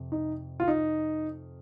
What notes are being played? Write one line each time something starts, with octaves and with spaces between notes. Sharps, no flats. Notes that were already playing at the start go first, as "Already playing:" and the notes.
Already playing: F2 C3
D#4
F4
D#4